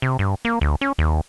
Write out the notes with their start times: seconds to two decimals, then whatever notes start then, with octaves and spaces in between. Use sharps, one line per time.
0.02 C3
0.19 G2
0.45 A#3
0.61 D2
0.81 C#4
0.98 D#2